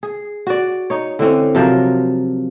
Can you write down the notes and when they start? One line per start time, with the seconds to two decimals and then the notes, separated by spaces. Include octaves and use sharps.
0.03 G#4
0.47 F#4 D5
0.90 D#4 C#5
1.19 D3 E3 C4 C#4
1.55 C3 F3 F#3 A#4